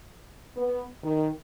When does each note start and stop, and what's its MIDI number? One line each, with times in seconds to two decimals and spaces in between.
0.56 0.85 59
1.03 1.30 51